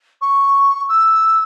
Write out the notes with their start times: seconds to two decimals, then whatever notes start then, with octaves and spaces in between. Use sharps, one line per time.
0.21 C#6
0.89 E6